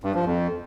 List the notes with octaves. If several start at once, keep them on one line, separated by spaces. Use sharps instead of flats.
G2
F3
F2